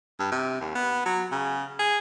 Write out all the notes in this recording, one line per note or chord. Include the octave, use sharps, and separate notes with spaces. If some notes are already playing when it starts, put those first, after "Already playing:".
G2
C3
D#2
B3
F#3
C#3
G#4